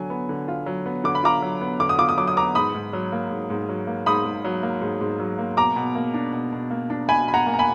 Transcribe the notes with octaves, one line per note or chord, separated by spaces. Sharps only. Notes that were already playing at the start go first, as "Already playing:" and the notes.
Already playing: D3 F#3 G#5
B3
D3
F4
F#3
B3
D3 D6
B5
F4 A#5 D6
F#3
B3
D3 D6
D#6
F4 D6
D#6
F#3 D6
D#6
B3 A#5 D6
G#2 B5 D#6
G#2
F#3
A#3
G#2
G#2
F#3
A#3
G#2 B5 D#6
G#2
F#3
A#3
G#2
G#2
F#3
A#3
B2 A#5 D6
B2
A#3
D4
B2
B2
A#3
D4
B2 G#5 B5
B2 B5
F#5 A#5
A#3
A#5
G#5 B5